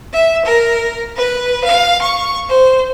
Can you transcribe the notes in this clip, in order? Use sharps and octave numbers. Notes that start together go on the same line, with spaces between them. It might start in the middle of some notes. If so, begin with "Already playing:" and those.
E5
A#4
B4
F5
C#6
C5